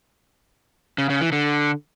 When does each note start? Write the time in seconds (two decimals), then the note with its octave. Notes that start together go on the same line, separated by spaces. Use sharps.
0.98 C#3
1.10 C#3
1.21 E3
1.32 D3